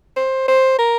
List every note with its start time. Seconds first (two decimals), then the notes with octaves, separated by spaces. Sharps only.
0.16 C5
0.48 C5
0.79 A#4